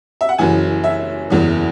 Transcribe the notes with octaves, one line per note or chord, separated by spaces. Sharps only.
E5
F#5
F#1 F#2 E3 G#5
E5
F#1 E2 E3